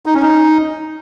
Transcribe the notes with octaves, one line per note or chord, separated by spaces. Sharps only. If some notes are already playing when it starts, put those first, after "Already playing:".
D#4
C#4
D#4